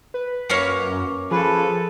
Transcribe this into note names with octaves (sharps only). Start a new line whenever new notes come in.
B4
F#2 A#3 C#4 C#5
F3 G#4 A4 B4